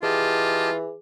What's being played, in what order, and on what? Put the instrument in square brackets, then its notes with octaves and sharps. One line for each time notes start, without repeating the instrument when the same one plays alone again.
[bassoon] E3 [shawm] F4 [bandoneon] G4 D#5 A5 [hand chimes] G#4